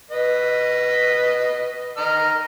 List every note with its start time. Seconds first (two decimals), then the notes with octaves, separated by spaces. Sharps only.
0.11 B4 D#5
1.97 D#5 A#5 F6